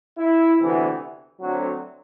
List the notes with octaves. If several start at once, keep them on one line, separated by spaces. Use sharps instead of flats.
E4
D2 C3 E3 B3
D2 D3 F#3 C4 F#4